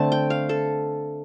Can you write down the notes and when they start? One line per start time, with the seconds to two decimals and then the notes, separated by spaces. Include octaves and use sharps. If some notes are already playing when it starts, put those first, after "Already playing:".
Already playing: D3 A3 C4 A5
0.12 G5
0.30 F5
0.49 A4